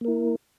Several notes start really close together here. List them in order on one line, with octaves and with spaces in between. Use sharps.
A#3 A#4 E4